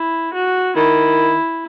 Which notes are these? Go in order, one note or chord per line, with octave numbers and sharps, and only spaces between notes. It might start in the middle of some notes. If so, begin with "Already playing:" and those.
Already playing: E4
F#4
D#3 E4